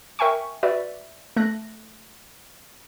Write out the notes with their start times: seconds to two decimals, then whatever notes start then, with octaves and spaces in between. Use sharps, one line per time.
0.19 A#4 E5 G5 G#5 C#6
0.63 F#4 B4 D5 E5
1.36 A3 F#6 A#6